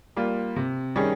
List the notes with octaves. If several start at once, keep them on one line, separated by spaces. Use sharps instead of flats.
G3 A#3 F4
C3
D#3 G3 C#4 G#4